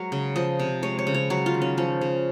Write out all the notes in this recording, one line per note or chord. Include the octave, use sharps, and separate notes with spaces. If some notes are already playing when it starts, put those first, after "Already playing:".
Already playing: F#3 G#3 A#4 C#5
C#3
F3 D#5
C3
G#3 C#5
C#5
C#3
C#5
F#3 C#5
F4
D#3
C#4
F3 C#4
C#3